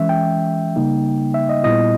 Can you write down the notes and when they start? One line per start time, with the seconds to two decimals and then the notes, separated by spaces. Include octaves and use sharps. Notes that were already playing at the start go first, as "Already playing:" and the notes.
Already playing: E3 G#3 C#4 E5
0.09 G5
0.76 C#3 G3 A#3 D#4
1.34 E5
1.49 D#5
1.64 A#2 G3 B3 E4 D#5